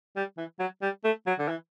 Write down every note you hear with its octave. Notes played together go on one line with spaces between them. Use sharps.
G3
E3
F#3
G3
A3
F#3
D3
E3